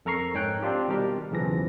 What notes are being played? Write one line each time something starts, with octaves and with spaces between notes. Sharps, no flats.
F2 A4 A#4 A#5 C#6 C7
G#2 C#5 G5 F#6
C4 D4 F4 G4
B2 D#3 G3 G4 A#4
B1 E2 C#3 E3 F3 A#6